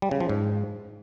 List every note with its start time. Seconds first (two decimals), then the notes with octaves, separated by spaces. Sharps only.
0.02 G3
0.11 C#3
0.20 F3
0.29 G#2